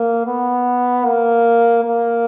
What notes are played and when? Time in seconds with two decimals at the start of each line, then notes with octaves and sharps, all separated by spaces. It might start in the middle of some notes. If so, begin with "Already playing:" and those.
Already playing: A#3
0.26 B3
1.05 A#3
1.84 A#3